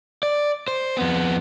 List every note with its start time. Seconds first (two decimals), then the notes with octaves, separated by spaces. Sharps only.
0.23 D5
0.68 C5
0.97 F2 B3